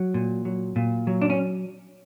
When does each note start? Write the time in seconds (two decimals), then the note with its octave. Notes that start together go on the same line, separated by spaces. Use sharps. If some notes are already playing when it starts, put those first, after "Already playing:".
Already playing: F#3
0.14 A#2
0.45 F#3
0.76 A#2
1.07 F#3
1.22 D4
1.30 C#4